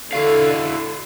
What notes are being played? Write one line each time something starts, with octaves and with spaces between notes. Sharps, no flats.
D3 E4 F#4 F5